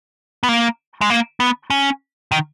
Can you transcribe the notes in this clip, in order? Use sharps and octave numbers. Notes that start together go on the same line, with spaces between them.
B3
A#3
G#3
A#3
B3
C#4
D#3